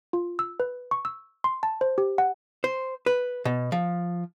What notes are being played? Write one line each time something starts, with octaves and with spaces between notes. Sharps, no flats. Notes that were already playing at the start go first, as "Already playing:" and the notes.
F4
E6
B4
C#6
E6
C6
A5
C5
G4
F#5
C5
B4
B2
F3